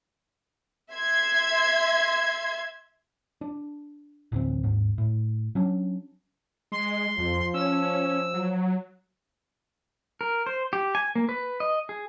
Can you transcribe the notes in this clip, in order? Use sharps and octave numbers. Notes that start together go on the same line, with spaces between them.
E5 C6 G#6
D4
A1 D2 C4
G#1 D#2 G#2
A2
F#3 C#4 D4
G#3 C6
F2 F3
C#4 E6
F#3
A#4
C5
G4
G#5
A#3
B4
D#5
G#4